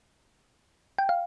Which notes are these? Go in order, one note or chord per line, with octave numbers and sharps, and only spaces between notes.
G5
F5